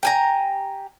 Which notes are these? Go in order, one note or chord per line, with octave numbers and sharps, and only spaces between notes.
G4 G#5 A#5